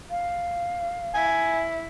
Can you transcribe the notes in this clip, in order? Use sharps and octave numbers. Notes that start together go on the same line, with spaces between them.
F5
E4 G#5